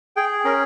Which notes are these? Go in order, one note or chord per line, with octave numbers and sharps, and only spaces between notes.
G#4 G5
C#4 A#4